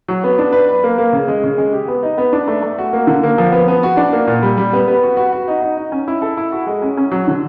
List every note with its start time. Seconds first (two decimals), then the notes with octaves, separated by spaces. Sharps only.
0.08 F#3
0.24 B3
0.39 D4
0.53 B4
0.69 B4
0.84 A#3
0.98 A#3
1.13 C#3
1.28 G#3
1.44 C#3
1.58 G#3
1.73 G4
1.88 B3
2.03 D#4
2.18 B3
2.33 D4
2.48 A3
2.62 A3
2.78 F#4
2.93 A#3
3.07 D3
3.23 A#3
3.38 F3
3.52 B3
3.68 B3
3.83 F#4
3.97 D4
4.13 A#3
4.28 A#2
4.42 G3
4.57 G3
4.73 B3
4.87 B3
5.03 F#4
5.17 F#4
5.33 F#4
5.48 D#4
5.62 D#4
5.77 D#4
5.92 C#4
6.08 E4
6.22 A4
6.37 E4
6.52 F#4
6.67 G#3
6.82 C#4
6.97 C#4
7.12 F#3
7.27 D3